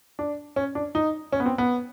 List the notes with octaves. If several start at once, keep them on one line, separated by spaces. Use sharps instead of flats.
D4
C#4
D4
D#4
C#4
B3
C4
B3